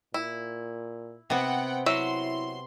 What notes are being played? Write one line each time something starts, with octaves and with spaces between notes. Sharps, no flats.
A#2 E4
C3 B3 C4 F#5 G5
F#3 E4 E5 C6